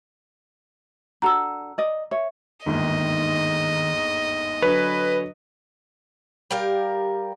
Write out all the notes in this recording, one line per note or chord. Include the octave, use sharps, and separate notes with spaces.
D4 F#4 A4 A#5 E6
D5 D#5
C#5 E5
G1 D#2 G#2 D#3 D#5
D3 F#3 B4 C#5 G#5 A#6
G3 G4 A#4 F5